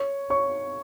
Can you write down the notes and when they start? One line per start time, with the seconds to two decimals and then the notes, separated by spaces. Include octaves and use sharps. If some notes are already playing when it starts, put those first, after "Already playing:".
Already playing: C#5 C#6
0.30 C#5 C#6